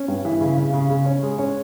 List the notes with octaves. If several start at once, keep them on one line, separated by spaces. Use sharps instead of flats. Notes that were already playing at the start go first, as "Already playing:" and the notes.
Already playing: C#4
G2
E3
C#3
C#3
C#3
C#3
C#4
G#3
C#4